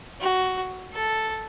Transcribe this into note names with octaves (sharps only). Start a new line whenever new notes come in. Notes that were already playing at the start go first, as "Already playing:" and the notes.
F#4
A4